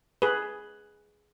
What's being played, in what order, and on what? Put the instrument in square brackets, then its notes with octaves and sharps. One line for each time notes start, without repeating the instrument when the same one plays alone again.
[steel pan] G#4 B4